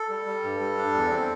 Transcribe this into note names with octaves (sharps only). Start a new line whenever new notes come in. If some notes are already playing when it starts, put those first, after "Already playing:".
Already playing: A4
G3
G3
G2
G3
D4
E2
C4